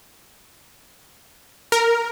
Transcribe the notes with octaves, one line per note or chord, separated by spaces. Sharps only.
A#4